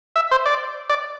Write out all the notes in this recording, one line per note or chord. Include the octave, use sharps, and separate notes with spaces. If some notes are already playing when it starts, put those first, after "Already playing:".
E5
C5
D5
D5